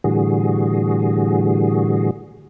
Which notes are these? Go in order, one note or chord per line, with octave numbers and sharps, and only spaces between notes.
A2 D3 E3 G3 F#4 G#4